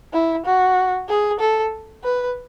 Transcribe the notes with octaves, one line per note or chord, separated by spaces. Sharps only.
E4
F#4
G#4
A4
B4